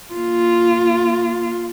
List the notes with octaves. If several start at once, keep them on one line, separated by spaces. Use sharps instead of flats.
A#3 F4